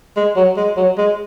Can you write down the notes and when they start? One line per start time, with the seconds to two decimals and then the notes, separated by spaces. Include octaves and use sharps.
0.17 G#3
0.36 F#3
0.57 G#3
0.77 F#3
0.98 G#3